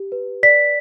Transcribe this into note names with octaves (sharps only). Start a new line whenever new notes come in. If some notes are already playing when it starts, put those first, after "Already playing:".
Already playing: G4
B4
D5 B6